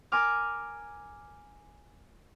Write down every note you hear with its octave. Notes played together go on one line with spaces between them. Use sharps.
A#4 G#5 D6 F6